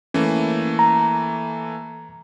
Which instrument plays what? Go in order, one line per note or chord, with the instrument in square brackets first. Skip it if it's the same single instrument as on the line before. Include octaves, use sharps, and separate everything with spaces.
[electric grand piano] E3 A3 A#3 [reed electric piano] C#4
[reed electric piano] A#5